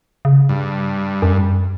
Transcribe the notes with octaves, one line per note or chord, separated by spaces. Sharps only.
C#3
G2
F#2